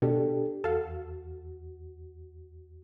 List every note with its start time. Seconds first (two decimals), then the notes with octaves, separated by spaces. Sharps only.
0.02 B2 D4 G4 A4
0.64 E2 F#4 A4 F5